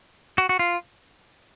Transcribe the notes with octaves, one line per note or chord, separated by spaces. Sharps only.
F#4
F#4
F4